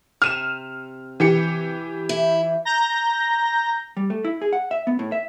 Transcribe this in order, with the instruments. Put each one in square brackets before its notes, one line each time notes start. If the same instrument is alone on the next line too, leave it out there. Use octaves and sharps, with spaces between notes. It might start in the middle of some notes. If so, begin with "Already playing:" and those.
[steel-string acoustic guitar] C3 [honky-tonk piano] F6 D#7 E7
[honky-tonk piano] E3 G4 C#7
[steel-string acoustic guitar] E4
[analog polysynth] A#5 G6 A#6
[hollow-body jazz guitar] G3
A3
E4
G#4
F#5
E5
B3
A2
E5